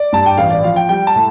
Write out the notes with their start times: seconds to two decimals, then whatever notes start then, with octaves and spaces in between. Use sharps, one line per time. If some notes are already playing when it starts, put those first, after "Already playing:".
Already playing: D5
0.13 G2 A5
0.26 G5
0.37 A1 F5
0.50 D5
0.64 F3 F5
0.76 G5
0.89 G3 G5
1.07 A5
1.15 A2